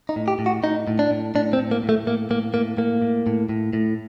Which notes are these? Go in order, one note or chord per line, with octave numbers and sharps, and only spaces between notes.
D#4
A2
G4
A2
F#4
A2 D#4
A2
D4
A2
A2 D4
C4
A2
A#3
A2
A3
A2 A#3
A2 A#3
A2 A#3
A2 A#3
A2
A2
A2
A2